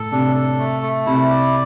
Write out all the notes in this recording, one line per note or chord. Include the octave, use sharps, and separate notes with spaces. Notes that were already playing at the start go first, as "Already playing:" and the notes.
Already playing: A2 A4
C3 D4
A4
A3
A3
C3 E4
D5